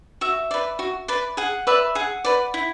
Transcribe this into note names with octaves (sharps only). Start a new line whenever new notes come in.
F#4 E5
B4 D5
F#4
B4 D5
G#4 F#5
B4 D5 E5
G#4 F#5
B4 D5
E4